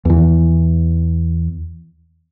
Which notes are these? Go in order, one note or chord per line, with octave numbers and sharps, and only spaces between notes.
E2 E3